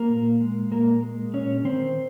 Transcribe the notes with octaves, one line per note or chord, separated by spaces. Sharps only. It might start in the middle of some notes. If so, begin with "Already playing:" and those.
Already playing: A#3 A#4
A#2
G#3
A#2 A#3 A#4
G#3
A#2 C#4 C#5
D#3 C4 C5